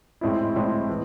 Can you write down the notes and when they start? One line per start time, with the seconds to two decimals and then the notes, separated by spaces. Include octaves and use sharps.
0.21 A2 G#3 C4 E4
0.55 A2 G#3 C4 E4
0.89 E3